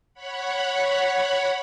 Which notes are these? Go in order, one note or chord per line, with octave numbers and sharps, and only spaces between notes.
C#5 F#5 B5